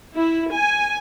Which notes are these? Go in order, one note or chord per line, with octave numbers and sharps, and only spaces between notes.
E4
G#5